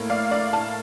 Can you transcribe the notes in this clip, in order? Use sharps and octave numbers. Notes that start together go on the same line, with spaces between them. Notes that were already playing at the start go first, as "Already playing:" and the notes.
Already playing: A2 A#3
D5 F5
D5 F5
F5 A5